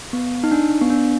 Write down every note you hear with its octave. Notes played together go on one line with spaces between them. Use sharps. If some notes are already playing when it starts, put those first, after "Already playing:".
B3
D#4
D4
B3
D4